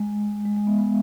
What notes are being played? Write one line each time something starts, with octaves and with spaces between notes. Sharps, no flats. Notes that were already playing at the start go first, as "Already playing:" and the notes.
Already playing: G#3
G#3
G#3
B3
B3